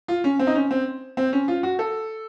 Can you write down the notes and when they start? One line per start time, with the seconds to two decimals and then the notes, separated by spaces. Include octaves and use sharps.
0.08 F4
0.24 C#4
0.39 C4
0.47 D#4
0.55 C#4
0.71 C4
1.17 C4
1.33 C#4
1.48 F4
1.63 F#4
1.79 A4